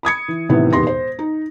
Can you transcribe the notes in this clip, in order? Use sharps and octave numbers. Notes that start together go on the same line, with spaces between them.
B5 D#6 G#6 C#7
E3
A2 C3 D#3 E3 B3
E1 D#2 B3 G4 C6 A#6
C5
D#4